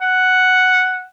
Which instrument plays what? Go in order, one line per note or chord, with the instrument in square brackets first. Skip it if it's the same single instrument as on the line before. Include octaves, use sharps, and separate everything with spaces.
[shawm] F#5